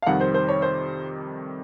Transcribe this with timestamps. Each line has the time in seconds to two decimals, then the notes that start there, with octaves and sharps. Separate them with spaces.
0.02 F5
0.06 F2 C3 D#3 G3 F#5
0.21 C5
0.34 C5
0.49 C#5
0.62 C5